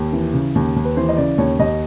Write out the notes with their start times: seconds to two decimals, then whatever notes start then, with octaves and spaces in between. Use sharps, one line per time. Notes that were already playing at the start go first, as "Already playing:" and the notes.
Already playing: D#2
0.13 E3
0.33 C#3
0.55 D#2
0.76 D#2
0.85 B4
0.97 E3 C5
1.08 D#5
1.17 C#3 D5
1.38 D#2 C#5
1.59 D#2 D#5